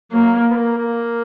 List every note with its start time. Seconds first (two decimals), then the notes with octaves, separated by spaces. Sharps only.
0.12 F#3 A#3
0.50 B3
0.56 A#3
0.78 A#3